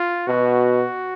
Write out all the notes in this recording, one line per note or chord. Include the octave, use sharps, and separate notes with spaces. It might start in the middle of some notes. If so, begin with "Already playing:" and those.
Already playing: F4
B2 F#4